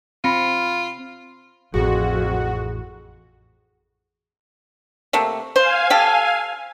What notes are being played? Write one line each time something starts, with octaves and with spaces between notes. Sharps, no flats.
C4 F4 B5 A#6 C#7
A1 F2 F#4 G#4
C3 A3 A#3
C5 F5 G#5
G4 A4